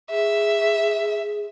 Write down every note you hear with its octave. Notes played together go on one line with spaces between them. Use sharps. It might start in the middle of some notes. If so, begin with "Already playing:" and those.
G#4 E5